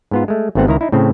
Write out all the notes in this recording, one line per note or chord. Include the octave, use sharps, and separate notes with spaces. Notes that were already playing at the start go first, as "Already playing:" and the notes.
G#2 B3 F4
G#3 A3
G#1 G#2 A3 B3 C4 F#5
C#2 D#3 E4 A#5
D#4 E4
A2 C#3 C4